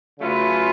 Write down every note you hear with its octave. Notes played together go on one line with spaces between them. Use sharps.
C#3 F#3 A3 F4 B4